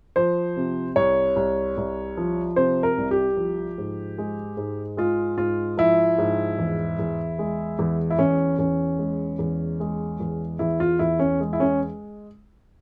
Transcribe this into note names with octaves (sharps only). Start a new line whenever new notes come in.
F3 C5
C3
C2 C#5
C2
C2
F3
C3 C5
A#4
C2
G4
F3
G#2
G#3
G#2
G#3 F4
G#2 F4
F3 E4
G#2
E2
E2
G#3
E2
E4
E2 C#4
E2 C#4
G#3
E2
G#3
E2
E2 E4
F4
E2 E4
C#4
G#3
E4
C#4